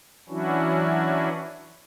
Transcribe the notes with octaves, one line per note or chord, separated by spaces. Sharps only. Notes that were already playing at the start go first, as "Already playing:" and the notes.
E3 F#3 C#4 D4 E4 F#4